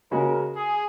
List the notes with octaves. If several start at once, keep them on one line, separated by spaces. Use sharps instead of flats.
C#3 G#3 C#4 F#4 A#4
G#4